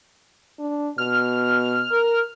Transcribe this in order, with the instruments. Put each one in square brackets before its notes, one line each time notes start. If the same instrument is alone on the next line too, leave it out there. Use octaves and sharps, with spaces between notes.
[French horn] D4
[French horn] B2 [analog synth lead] F6
[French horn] A#4